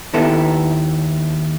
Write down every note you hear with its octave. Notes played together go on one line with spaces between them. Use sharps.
D#2 B3 E4 A4